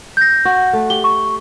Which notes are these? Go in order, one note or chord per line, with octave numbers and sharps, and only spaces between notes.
G6 A#6
F#4
A3
G4 G7
C#6